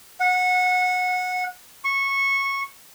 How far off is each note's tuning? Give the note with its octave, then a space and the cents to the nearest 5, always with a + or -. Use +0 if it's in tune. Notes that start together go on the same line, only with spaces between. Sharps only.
F#5 -20
C#6 -15